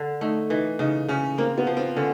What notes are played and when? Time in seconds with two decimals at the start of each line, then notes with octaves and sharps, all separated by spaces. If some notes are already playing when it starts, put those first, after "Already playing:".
Already playing: D3
0.21 A3 D#4
0.50 E3 D#4
0.79 C#3 D#4
1.09 C#3 C#4
1.38 A#3 C4
1.58 B3
1.67 F3
1.77 C4
1.96 D3 C#4